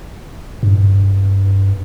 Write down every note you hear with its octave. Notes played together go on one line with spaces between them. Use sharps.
G2